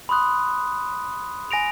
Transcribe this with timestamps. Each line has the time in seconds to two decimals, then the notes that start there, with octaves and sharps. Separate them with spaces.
0.09 B5 C6 D#6 F#6
1.51 G#5 A#6 D7 F7